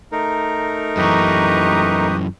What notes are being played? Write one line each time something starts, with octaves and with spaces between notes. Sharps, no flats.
A3 D#4 A#4
F#2 E3 G4 B4 D#5 A#5 C#6